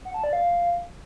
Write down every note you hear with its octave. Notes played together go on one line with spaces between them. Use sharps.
F#5
A5
D5
F5